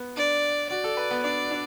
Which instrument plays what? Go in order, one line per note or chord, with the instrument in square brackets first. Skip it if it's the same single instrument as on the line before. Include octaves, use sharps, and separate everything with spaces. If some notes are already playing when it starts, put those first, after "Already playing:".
Already playing: [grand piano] B3
[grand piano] D4 [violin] D5
[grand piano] F#4 [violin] D5
[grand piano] A4
B4
B3
[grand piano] D4 [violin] D5
[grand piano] D4